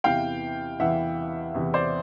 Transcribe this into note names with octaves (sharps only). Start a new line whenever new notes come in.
E2 C3 E3 F5 G5
E2 C3 E3 E5 F#5
E2 C3 E3
C5 D5